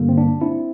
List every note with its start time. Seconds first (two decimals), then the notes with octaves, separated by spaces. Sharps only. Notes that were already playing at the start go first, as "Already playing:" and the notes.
Already playing: G2 D3 G3 A#3
0.09 C4
0.18 D4
0.41 C4 E4